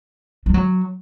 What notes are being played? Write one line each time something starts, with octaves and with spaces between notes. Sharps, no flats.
G3
F#3